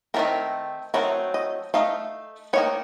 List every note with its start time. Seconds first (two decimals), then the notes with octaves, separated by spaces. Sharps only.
0.14 F#3 A3 C4 A#4
0.19 D#3
0.94 F#3 A3 C4 D#4 A#4
1.34 D#5
1.74 A3 D#4 F5
2.53 D#3 A#3 D#4 C#5